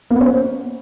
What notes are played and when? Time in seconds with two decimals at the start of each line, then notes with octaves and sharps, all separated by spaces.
0.10 A#3
0.16 B3
0.21 C#4
0.26 C5